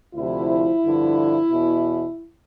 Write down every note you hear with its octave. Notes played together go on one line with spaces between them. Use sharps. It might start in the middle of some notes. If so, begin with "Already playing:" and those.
D2 C3 F3 E4
G2 D3 F3
E2 B2